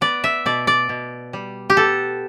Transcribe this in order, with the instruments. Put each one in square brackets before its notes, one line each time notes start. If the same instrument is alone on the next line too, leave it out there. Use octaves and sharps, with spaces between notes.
[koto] B3 D5
E5
B2 D5
D5
B2
G3
G4
B3 A4